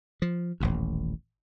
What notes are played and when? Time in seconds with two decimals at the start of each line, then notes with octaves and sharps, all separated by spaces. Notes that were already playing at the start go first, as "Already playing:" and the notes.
0.22 F3
0.60 D#1 A1 D#2